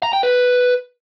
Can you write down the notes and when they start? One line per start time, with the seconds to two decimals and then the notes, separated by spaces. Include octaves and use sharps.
0.03 A#5
0.13 G5
0.23 B4